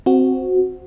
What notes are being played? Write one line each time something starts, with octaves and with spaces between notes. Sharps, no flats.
C4 F#4